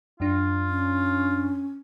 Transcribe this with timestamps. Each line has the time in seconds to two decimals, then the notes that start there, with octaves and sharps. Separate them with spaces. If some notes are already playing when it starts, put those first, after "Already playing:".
0.20 F#2 D4 F4
0.69 C#4